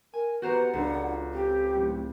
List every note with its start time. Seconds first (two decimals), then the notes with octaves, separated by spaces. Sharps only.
0.14 A#4 G#5
0.42 B3 F#4 G4 B4 C5 F#5 A#5
0.73 C#2 D4 F4 A4
1.33 C4 G4
1.74 F#2 A2